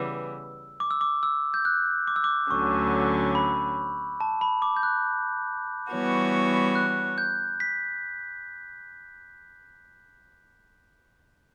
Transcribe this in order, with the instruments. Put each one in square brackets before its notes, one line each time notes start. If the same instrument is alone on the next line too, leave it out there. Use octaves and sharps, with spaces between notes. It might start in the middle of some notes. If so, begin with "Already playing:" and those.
Already playing: [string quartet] C#3 E3 G3 B3 [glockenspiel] E6
[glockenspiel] D6
E6
D6
E6
G6
F#6
D6
E6
D6
[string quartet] D2 D3 F#3 C#4 [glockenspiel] C#6
[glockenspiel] B5
A5
B5
D6
G6
F#6
[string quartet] E3 G3 B3 F#4 C#5
[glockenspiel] F#6
G6
B6